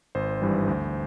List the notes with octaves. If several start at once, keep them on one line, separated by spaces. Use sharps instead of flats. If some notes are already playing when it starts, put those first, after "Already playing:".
G#1 C5
G2 E3 G3
D2